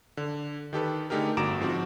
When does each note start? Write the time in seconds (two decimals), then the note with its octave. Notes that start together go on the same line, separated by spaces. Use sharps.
0.17 D3
0.73 D#3 G4 A4 B4
1.10 D3 A3 D#4 G4 G#4 A#4
1.37 G1 F#4 A#5 D6 D7 E7
1.60 G#2 F3 C4 F#4